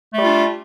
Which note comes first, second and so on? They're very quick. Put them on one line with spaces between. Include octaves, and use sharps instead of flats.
A3 G3 F4 D4